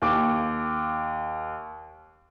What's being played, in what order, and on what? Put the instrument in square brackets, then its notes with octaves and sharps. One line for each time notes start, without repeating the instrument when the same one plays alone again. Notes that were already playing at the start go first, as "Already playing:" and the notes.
[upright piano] D#2 D6